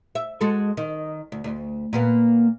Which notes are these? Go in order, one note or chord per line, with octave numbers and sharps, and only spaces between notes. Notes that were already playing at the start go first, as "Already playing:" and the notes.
E5
G#3 F#4 A4
D#3
D2
D2
A#2 A#3 B3